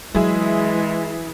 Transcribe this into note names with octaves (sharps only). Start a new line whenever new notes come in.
E3 F#3 G#3 E4 G#4 E5